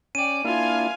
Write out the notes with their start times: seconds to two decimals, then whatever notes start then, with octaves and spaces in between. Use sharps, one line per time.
0.15 C#4 D5 G5 D#7
0.44 A#3 D4 E4 F4 F5 G#5